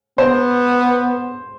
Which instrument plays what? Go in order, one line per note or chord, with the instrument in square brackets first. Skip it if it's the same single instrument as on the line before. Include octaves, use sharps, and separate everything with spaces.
[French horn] B3 [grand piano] C5